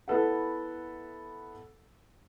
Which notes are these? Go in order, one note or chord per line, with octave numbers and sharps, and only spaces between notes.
B3 E4 A4 B4 F#5